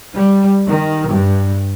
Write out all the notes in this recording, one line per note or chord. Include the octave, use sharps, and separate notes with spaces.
G3
D#3
G2